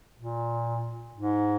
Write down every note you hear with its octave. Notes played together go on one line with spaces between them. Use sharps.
A#2
G#2